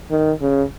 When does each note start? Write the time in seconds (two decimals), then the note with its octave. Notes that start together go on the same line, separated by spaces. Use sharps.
0.11 D#3
0.41 C#3